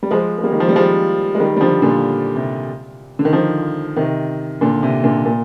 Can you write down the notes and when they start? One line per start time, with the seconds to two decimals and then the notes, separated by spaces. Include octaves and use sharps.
0.03 G3
0.11 F3 G#3
0.38 G#3
0.43 G3 A#3
0.52 D#3
0.60 F3
0.68 G3
0.75 F3 G#3
1.35 G#3
1.40 D#3 G3
1.57 G3
1.61 D3 F3
1.82 A#2 D3
2.36 C3
3.19 D3
3.25 D#3
3.33 D3 F3
3.96 C3 D#3
4.61 A#2 D3
4.83 C3
5.04 A#2 D3
5.25 A#2